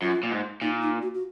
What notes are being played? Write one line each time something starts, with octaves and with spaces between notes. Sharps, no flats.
F#2 F4
A#2
G#2
A#2 D#4
D#4
F#4
F#4